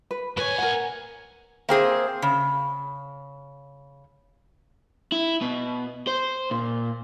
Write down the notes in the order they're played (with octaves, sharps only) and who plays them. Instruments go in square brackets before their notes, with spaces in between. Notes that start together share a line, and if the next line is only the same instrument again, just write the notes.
[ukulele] B4
[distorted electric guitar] A2 G#5 [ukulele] B4 C#5
[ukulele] A#4 F#5
[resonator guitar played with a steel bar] A#3 C4 G#4 C5
C#3
[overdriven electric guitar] E4
B2
C5
A#2